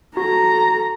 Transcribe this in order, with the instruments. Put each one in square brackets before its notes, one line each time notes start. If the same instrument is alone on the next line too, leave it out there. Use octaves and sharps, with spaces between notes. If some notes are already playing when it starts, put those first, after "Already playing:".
[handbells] F#4 [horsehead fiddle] A4 A#5